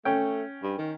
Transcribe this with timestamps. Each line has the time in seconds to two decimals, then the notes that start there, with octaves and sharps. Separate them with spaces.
0.05 A3 C#4 G5
0.63 G2
0.78 D#3